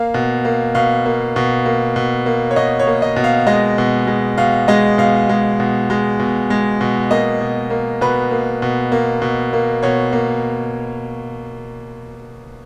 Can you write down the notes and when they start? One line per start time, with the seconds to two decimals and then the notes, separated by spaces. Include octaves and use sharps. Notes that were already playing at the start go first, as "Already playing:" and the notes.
Already playing: A#3 F5
0.14 B2
0.45 A#3
0.75 B2 F5
1.06 A#3
1.36 B2
1.65 A#3
1.96 B2
2.26 A#3
2.51 C#5
2.56 B2 D#5
2.79 C#5
2.87 A#3
3.02 D#5
3.16 B2
3.24 F5
3.47 G#3 D#5
3.78 B2
4.07 G#3
4.38 B2 F5
4.68 G#3 D#5
4.98 B2 F5
5.29 G#3
5.60 B2
5.90 G#3
6.19 B2
6.50 G#3
6.81 B2
7.11 A#3 D#5
7.41 B2
7.70 A#3
8.01 B2 B4
8.31 A#3
8.62 B2
8.92 A#3
9.22 B2
9.53 A#3
9.83 B2 C#5
10.13 A#3